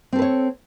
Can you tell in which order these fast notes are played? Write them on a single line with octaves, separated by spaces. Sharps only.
C4 A4 B4 C#5